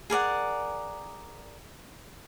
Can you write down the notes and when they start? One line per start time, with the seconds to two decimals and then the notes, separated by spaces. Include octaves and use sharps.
0.10 G#4 A#4 D5 F#5